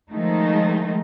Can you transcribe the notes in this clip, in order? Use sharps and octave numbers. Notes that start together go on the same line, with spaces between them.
D#3 F3 G#3 A3 D#4